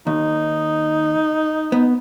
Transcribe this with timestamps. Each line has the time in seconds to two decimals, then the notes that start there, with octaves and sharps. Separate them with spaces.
0.07 D#2 D#4
1.72 B3